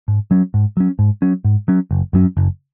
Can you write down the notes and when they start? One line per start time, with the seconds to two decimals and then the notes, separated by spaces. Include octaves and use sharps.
0.08 G#2
0.31 F#3 C#4
0.54 G#2
0.77 F#3 C#4
0.99 G#2
1.22 F#3 C#4
1.45 G#2
1.68 F#3 C#4
1.91 F#1
2.13 F#2 F#3 C#4
2.37 F#1